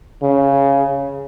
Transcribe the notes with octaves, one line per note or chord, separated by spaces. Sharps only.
C#3